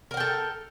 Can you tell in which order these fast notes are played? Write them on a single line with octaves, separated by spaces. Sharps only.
A#4 F#5 G5 A4